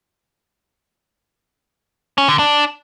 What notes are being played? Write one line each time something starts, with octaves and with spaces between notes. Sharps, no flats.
C#4
D3
D4